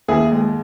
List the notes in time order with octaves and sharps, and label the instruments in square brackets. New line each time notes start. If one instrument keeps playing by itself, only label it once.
[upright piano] D#2 [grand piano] E4 G#4
[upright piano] G#3